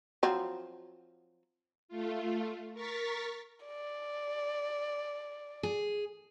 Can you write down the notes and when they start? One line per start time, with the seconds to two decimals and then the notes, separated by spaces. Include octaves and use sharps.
0.23 F3 F#3 C4
1.88 A3 F4
2.74 A#4 C#6 A6 B6
3.66 D5
5.63 G#4